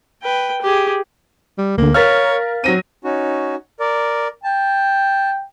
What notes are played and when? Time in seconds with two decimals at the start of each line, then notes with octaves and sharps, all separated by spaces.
0.23 B4 G5
0.61 G4 G#4
1.58 G3
1.78 D2 D3 A#3
1.94 A#4 C#5 F5 F6 A6 B6
2.64 F#3 C4 A#6 D#7
3.04 C#4 D#4 F#4
3.80 A#4 D5
4.44 G5 A5